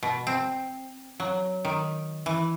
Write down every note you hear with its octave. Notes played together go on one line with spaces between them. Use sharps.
B2
C4
F#3
D#3
E3